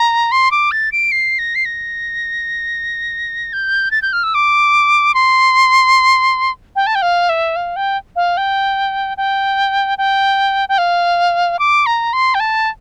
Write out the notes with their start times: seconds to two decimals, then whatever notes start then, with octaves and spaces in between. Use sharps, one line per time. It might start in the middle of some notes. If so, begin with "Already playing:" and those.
Already playing: A#5
0.32 C6
0.51 D6
0.71 A6
0.92 D7
1.12 C7
1.39 A#6
1.55 C7
1.65 A#6
3.53 G6
3.91 A6
4.02 G6
4.13 F6
4.23 E6
4.34 D6
5.14 C6
6.76 G5
6.87 A5
6.95 G5
7.02 F5
7.29 E5
7.56 F5
7.76 G5
8.16 F5
8.37 G5
9.17 G5
9.98 G5
10.69 G5
10.78 F5
11.59 D6
11.86 A#5
12.13 C6
12.34 G5
12.40 A5